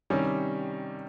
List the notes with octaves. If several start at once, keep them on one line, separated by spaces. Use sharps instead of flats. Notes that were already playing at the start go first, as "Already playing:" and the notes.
C3 D#3 G3 C#4